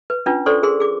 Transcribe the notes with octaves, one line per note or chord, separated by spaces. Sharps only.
B4
C#4 D4 F4 B4
A4 C5 D5 C6 C#6
G#4 A#4 C6
G#4 D6